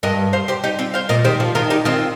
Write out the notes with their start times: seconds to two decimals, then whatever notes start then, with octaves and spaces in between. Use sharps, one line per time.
0.03 G2 A#4 D#5
0.33 C5 F5
0.48 G4 C5
0.64 D#4 G4
0.79 C4 F4
0.94 C5 F5
1.09 A#2 A#4 D#5
1.24 D#3 G4 C5
1.40 F3
1.55 D#3 F4 A#4
1.70 D#4 G4
1.85 D#3 C4 F4